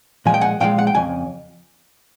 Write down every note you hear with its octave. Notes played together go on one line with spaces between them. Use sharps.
A#2 F3 G#3 G#5
G5
F#5 G#5
A#2 F3 G#3 F5 G5
F#5
G5
F2 C#3 G#5